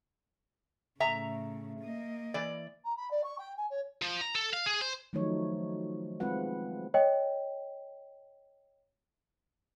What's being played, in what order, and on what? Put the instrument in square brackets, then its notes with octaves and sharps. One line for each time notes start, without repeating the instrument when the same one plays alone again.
[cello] A2 C#3 [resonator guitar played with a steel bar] E5 A#5
[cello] A#3 D#5
[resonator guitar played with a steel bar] E3 D5
[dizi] A#5
B5
D5
C#6
G5
G#5
C#5
[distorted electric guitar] F3
A#5
A4
F5
G#4
C5
[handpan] D#3 F3 F#3 A3 D#4 C#5
G#3 C4 F4 B4 F#5
[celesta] C#5 D#5 G5